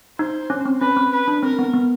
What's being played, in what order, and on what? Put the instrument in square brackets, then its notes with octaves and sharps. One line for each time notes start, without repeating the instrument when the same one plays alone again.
[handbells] D#4 [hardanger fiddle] C5
[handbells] C#4
C4
[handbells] C#4 [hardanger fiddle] B4
[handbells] C4
[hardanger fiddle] B4
[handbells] D4
[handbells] C4 [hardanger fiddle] A#4
[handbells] B3
B3